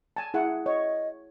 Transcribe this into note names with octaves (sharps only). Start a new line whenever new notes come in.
G#5 A5
E4 G#4 F#5
C#5 D#5